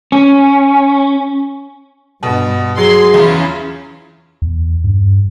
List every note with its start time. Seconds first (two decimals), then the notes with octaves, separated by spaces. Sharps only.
0.12 C#4
2.23 G2 B2 B3
2.78 F#3 G#4 C6
3.14 E2 C#4 E4 F4
4.42 E2
4.84 G2